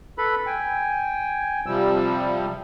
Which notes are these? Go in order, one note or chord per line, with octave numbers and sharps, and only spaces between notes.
A4 B4 B5
G5 G#5
C3 F3 G3 E6